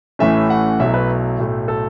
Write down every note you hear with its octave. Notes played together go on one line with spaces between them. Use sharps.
A1 A2 E3 A3 C#4 E5
F#5
B1 B2 F#3 A3 E4 E5
B4
B1 A2 A3
A4